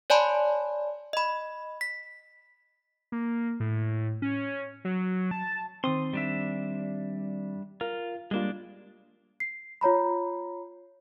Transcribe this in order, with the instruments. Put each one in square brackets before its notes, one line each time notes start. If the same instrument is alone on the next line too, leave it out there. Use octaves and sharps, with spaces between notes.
[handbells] C#5 D5 G#5 A5 B5 C6
D#5 B5
B6
[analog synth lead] A#3
A2
C#4
F#3
A5
[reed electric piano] D#3 C4 [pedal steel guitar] C6 D#6
[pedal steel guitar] G3 D4 E5
[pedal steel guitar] F4 [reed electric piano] A#4
[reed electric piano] G3 A#3 F4 [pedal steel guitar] G#3 D4
[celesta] C7
F4 C#5 A#5 B5